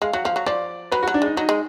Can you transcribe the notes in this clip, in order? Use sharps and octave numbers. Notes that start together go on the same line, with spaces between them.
G#3 F5
F#3 F#5
F3 F5
F#3
F3 D5
F#3 B4
F#3 F#4
D4
G#3 D#4
F#3 D#4
G#3